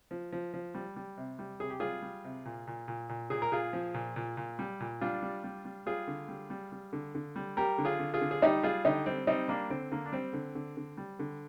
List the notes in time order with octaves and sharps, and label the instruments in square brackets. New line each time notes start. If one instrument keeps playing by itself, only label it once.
[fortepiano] F3
F3
F3
G3
G3
C3
G3
C3 G#4
G4
G3 F4 G#4
G3
C3
A#2
A#2
A#2
A#2
A#2 G#4
A#4
A#2 F4 G#4
F3
A#2
A#2
A#2
G3
A#2
G3 D4 F4
G3
G3
G3
G3 F4 G#4
D3
G3
G3
G3
D3
D3
G3
G3 G4 A#4
D3
F4 G#4
D3
F4 G#4
D3
G#4
G3 D#4 G4
G3 F4 G#4
D3 D#4 G4
G3 C4
G3 C4 D#4
G3 A#3 D4
D3 C4
D3 A#3
D4
G3 C4
D3
D3
D3
G3
D3